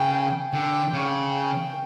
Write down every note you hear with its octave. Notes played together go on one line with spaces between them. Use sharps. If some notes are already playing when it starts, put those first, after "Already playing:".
Already playing: C#3 G5
D3 G5
C#3
G5